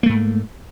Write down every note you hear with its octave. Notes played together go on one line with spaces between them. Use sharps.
G#2 A3 A#3